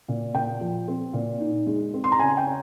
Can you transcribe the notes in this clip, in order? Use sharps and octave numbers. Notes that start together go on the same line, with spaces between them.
A#2
A#2 G5
F3
C4
A#2
D#4
G#3
C4
C6
A#5
C#3 G#5
G5
C#4